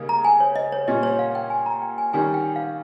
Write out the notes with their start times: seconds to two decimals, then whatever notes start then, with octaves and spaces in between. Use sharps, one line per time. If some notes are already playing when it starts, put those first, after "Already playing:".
Already playing: C#3 G3 A#3 D#4
0.09 A#5
0.25 G#5
0.40 C#5
0.56 D#5
0.72 C#5
0.88 A#2 G3 C#4 D#5
1.03 C#5
1.19 F5
1.35 G5
1.50 G#5
1.66 A#5
1.82 G5
1.98 G#5
2.13 D#3 G3 C#4 G#5
2.34 G5
2.56 F5